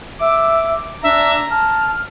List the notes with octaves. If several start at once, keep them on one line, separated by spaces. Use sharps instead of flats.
E5 D6
D4 E5 A#5
A5 F6